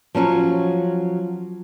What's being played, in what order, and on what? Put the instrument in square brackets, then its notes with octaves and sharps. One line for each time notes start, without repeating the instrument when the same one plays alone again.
[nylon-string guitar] F3 F#3 C#4 C#5